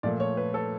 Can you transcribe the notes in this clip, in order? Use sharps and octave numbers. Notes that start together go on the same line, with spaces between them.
A#2 F3 A3 D5
C#5
B4
A4